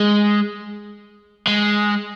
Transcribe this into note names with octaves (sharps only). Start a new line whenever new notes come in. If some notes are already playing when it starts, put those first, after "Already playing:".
Already playing: G#3
G#3